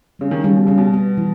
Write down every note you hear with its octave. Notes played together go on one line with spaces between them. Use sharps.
C#3 G3
D#3
C#3 G3
B2
C#3 G3
B2
B3
E3